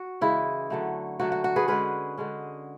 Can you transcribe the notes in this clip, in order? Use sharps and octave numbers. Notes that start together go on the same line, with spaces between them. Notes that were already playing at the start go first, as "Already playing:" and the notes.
Already playing: F#4
C#3 E3 G#3 E4
D3 F#3 A3
D3 F#3 A3 F#4
F#4
F#4
G#4 B4
D3 G#3 C#4 G#4 B4
D3 G#3 C#4